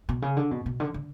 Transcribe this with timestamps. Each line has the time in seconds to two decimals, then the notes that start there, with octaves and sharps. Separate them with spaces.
0.09 B2
0.22 C#3
0.37 D3
0.51 B2
0.66 B2
0.80 D3
0.94 D3